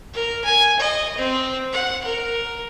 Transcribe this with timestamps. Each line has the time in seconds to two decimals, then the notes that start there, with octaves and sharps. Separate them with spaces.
0.13 A#4
0.44 G#5
0.80 D#5
1.18 C4
1.72 F#5
2.05 A#4